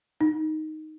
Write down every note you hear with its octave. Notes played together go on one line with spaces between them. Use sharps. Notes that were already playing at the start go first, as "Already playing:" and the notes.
D#4